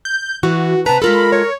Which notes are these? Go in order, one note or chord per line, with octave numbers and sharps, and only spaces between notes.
G6
E3 F#4
C3 B4 A5 A#5
G#3 F4 A4 A#4 B5
C#5